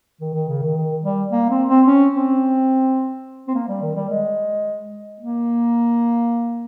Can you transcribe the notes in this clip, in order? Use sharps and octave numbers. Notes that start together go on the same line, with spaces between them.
D#3
D#3
C#3
D#3
D#3
G3
A#3
C4
C4
C#4
C4
C4
A#3
G3
D#3
G3
G#3
A#3